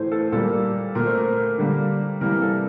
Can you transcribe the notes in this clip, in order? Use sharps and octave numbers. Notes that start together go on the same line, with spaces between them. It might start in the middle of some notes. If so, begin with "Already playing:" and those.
Already playing: A2 E3 A3 C5
A4
A#2 G3 A#3 A4
A#2 A3 A#4
C5
A#4
D3 G3 A#3
C3 E3 G3 A#3 A#4
A4